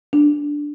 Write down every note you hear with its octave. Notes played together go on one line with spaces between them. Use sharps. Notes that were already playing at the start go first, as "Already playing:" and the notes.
D4